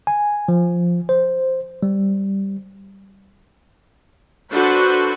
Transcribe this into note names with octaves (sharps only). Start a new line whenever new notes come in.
G#5
F3
C5
G3
D4 F#4 A4 B4 C5